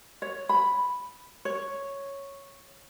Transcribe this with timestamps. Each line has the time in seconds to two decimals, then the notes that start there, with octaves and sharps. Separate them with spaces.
0.22 C#5
0.49 B5
1.45 C#5